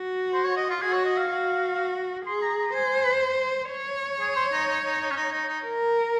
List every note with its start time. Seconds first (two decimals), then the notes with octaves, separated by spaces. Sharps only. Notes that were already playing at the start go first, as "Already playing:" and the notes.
Already playing: F#4
0.33 C5
0.45 C#5
0.57 D#5
0.70 F4
0.81 F#4 G#4
0.93 C#5
1.05 D#5
1.17 F5
1.30 F#4
2.26 G#4 C6
2.42 A#5
2.58 A#5
2.74 C5 G#5
3.71 C#5
4.20 G#4
4.36 C5
4.52 D#4
4.68 D#4
4.85 D#4
5.01 D#4
5.11 C#4
5.16 D#4
5.32 D#4
5.48 D#4
5.64 A#4